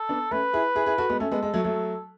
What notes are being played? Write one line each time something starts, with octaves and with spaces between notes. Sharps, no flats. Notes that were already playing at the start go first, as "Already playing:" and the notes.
Already playing: A4
B3 D4
A3 C#4 B4
E4 G#4
E4 G#4
E4 G#4
F#4 A4
G#3 B3
A3 C#4 A4
G#3 B3
G#3
F#3 A3
F#3 A3